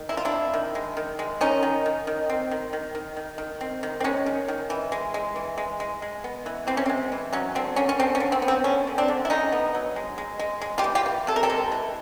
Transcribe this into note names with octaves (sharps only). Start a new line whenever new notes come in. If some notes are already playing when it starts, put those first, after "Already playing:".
Already playing: D#3
G#3 E4
F4
D4 E4
C4
D#3
G#3
D#3
G#3
D#3 C#4 D#4
D#3
D#3
D#3
C4
D#3
D#3
D#3
D#3
D#3
C4
D#3
C4
G#3 C#4
D#3
D#3
E3
G#3
G#3
E3
G#3
G#3
G#3
B3
E3
E3 C4
C#4
G#3 C4
E3
F#3 C#4
D3 C4
D3 C#4
C#4
D3 C4
C#4
D3
C4
B3
C4
D3 C#4
D3
C4 D4
D3
E4
D3 C#4 D#4
B3
F#3
G#3
G#3
G#3
G#3
F4 G4
E3
F4 G4
E3
C3 A4
A#4
G4 A4
G#3
E3